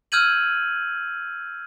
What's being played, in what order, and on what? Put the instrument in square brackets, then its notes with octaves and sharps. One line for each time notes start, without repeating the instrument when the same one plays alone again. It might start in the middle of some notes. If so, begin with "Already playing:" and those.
[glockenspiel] E6 F6 G6 G#6 D#7 F#7